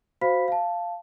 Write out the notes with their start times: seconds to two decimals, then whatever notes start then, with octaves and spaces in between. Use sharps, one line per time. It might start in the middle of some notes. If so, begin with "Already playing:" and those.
0.21 F#4 C5 F5 B5 B6
0.48 F5 A5